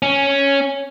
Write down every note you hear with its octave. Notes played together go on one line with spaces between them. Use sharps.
C#4